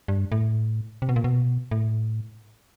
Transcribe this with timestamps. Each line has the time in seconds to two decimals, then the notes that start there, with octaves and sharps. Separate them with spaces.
0.08 G2
0.32 A2
1.02 C3
1.09 B2
1.16 A#2
1.24 B2
1.71 A2